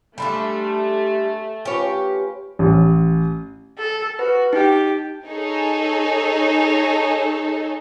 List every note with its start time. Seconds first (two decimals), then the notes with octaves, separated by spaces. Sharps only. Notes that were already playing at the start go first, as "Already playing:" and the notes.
0.18 G3 A3 D4 A4 G#5 B5 C6
1.65 C#4 F4 G4 B4 C#5
2.59 A1
3.78 A4
4.19 F#4 B4
4.53 D#4 G4
5.27 D#4 G#4 A4 C#5